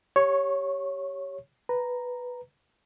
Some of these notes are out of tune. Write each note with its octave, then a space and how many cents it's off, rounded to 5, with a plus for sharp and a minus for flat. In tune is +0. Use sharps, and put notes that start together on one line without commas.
G4 +0 C#5 +0 C#6 -25
B4 +0 A#5 +0